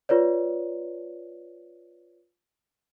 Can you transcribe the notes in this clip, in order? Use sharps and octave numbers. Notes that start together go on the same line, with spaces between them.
F4 B4 C#5 D5